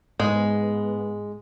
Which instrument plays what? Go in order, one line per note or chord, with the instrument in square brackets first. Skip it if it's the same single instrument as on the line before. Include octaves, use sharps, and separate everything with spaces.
[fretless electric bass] G#2 [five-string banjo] G#3 [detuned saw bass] B3